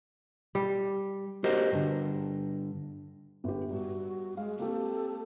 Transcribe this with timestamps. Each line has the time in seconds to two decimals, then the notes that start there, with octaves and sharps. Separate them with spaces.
0.55 G3
1.44 F#4 G4 A#4 C5 D#5
1.72 G2 D3
3.44 G1 G4
3.71 G2 F#4
4.37 G#3 F5
4.59 A#3 C4 G4 A4